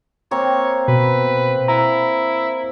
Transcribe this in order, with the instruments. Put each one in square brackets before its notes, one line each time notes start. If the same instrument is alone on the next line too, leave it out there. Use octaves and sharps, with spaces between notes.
[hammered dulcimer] A#3 C4 [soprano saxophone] C#5
[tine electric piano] B2 [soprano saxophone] B4
[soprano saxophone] E4 [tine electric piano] A#5